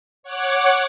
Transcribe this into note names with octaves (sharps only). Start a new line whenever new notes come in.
C#5 F#5 D6